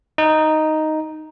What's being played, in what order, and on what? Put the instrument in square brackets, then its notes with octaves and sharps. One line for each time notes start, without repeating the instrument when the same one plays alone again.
[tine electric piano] D#4